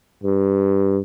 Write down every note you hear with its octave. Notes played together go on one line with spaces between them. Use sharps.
G2